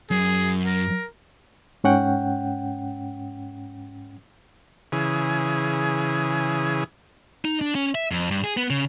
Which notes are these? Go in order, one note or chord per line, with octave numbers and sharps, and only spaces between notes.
F#2 G#4
A#4
G#2 C#4 F#5 G5
C#3 E3 G#4
D#4
D4
C#4
E5
F2
G2
G#4
B3
C#3